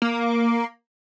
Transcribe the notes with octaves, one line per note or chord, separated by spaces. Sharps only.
A#3